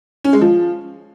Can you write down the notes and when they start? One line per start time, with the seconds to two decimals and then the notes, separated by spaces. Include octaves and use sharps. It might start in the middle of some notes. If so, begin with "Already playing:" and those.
0.24 C#4
0.33 G#3
0.41 F3